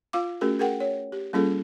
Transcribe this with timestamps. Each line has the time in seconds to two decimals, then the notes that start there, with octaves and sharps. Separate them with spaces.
0.13 F4 F5 D6
0.41 A3 C#4 F#4 G#4 A#4
0.59 G#4 A#4 F#5 G5
0.80 C#5
1.12 G4
1.33 G3 A#3 C#4 F4 G#4 A4